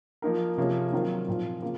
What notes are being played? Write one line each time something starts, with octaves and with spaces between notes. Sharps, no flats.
F3 A#3 D#4 A#4
C3 F3 A#3 C#4 G#4
D#3 F#3 C4 F4 A#4
A#2 F3 C4 F4
C#3 A#3 F4